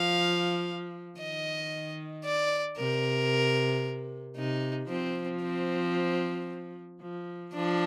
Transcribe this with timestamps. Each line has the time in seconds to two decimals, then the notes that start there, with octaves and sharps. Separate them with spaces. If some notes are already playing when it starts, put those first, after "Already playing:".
Already playing: F3 F5
1.18 D#3 D#5
2.24 D5
2.77 C3 A#4
4.36 C3 D#4
4.89 F3 C4
5.42 C4
7.01 F3
7.54 F3 D4